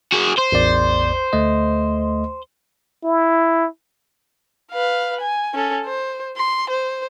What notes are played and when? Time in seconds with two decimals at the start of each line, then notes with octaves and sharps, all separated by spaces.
0.12 F#4 G#4
0.38 C5
0.52 A1 E2 D5
1.33 D2 A3 D#5
3.04 E4
4.72 B4 F5
5.21 G#5
5.54 C#4 A4
5.85 C5
6.37 C6
6.70 C5